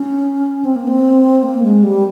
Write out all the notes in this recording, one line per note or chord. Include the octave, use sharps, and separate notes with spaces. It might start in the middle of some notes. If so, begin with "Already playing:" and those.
Already playing: C#4
C4
A#3
C4
A#3
G#3
G3